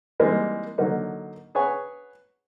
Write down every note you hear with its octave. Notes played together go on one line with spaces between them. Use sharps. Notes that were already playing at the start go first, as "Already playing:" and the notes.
E3 G3 G#3 A#3 C4 D#4
D3 F#3 A#3 D#4
G#4 B4 C#5 F#5 G#5